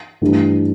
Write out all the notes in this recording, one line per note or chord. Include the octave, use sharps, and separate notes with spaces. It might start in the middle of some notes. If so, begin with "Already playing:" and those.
G2 E3 A3 D4